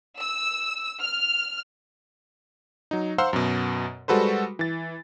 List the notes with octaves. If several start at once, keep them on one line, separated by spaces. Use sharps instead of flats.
E6
F6
F#3 D#4
C5 F5 F#5 A#5 C6 E6
F#2 B2
G3 G#3 F#4 A4 B4 C5
E3 A6